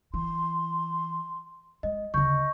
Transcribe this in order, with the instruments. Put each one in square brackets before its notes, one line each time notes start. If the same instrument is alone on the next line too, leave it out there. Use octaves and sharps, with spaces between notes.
[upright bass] E3 [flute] C6
[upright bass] G#3 [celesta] D#5
[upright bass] D2 C#3 [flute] D#5 [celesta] C#6 G6